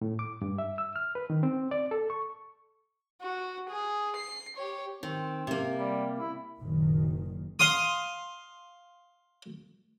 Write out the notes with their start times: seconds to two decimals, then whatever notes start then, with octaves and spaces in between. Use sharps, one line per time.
0.01 A2
0.19 D6
0.42 G2
0.58 E5
0.78 E6
0.96 F6
1.15 B4
1.30 D#3
1.43 C4
1.71 D5
1.91 A4
2.10 C#6
3.22 F#4
3.70 G#4
4.16 C7
4.57 G4 C#5
5.03 D#3 C4
5.47 C3 A#3
5.77 G3
6.20 E4
6.59 F#1 A#2 D#3
7.59 F5 C6 D#6